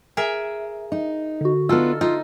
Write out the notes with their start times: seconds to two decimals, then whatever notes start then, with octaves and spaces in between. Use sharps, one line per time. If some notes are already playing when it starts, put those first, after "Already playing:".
0.17 G#4 A#4 E5
0.92 D#4
1.41 D3 F#4
1.69 B3 D4 D#4 F4 A4 E6 F6
2.01 D#4 F4